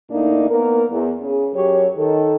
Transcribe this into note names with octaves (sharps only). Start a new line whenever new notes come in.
A2 A#3 D4 D#4
A#3 B3 A#4
E2
C#3 G#4
F#2 F#3 G4 C#5
D#3 A4